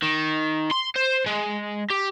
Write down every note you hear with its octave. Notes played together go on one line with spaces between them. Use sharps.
D#3
C6
C5
G#3
G4